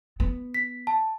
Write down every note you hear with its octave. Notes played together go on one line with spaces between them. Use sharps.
B3
B6
A5